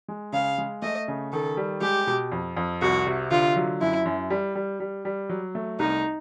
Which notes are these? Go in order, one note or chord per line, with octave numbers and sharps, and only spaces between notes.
G#3
C#3 F5
G#3
A3 D#5
C#3
D#3 A4
G3
G#3 G4
B2
F2
F2
C2 F#4
C3
D3 F4
F#3
F#2 E4
F#2
G3
G3
G3
G3
F#3
A3
C2 D#4